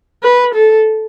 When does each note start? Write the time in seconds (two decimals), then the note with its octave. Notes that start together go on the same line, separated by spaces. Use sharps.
0.23 B4
0.54 A4